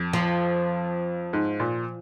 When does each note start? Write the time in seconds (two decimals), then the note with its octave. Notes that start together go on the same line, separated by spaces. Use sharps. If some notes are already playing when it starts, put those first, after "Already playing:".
Already playing: F2
0.13 F3
1.33 G#2
1.60 A#2